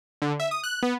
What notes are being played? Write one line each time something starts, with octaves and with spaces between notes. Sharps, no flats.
D3
E5
D#6
F#6
B3